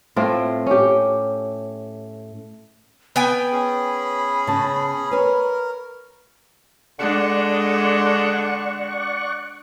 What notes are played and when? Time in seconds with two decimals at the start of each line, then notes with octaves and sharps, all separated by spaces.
0.16 A2 C4 F4
0.66 C#4 G4
3.16 B3 G5 G#5 B5
3.52 C#4 G#4
4.47 C#3 A5
5.11 A#4 B4 C#5
6.99 D3 G#3 D4 D5 F#5 C#6